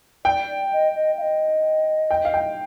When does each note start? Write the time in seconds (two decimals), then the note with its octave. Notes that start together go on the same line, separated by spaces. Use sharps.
0.25 D5 G5
0.47 D5
0.71 D#5
0.94 D#5
1.17 F5
1.21 D#5
2.11 G5
2.25 F5
2.34 G5